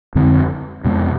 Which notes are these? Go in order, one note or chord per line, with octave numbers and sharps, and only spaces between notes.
F2 D3 G#3 C4
F2 C3 G#3 B3